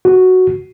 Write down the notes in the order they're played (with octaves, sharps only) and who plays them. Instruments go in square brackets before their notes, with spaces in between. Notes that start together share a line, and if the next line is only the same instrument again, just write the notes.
[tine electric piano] F#4